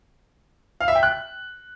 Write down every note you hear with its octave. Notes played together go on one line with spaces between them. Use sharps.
F5
E5
G5
F#6